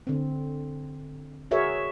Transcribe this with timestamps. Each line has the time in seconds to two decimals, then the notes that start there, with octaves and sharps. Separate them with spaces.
0.07 D3 C4
1.51 F#4 G#4 A#4 C#5 E5